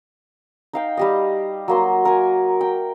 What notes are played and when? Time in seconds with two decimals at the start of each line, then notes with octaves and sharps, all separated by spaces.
0.73 D#4 F5 G5
0.97 G3 G4 D#5
1.68 F#3 A#3 C6
2.05 A#4 G#5
2.61 G5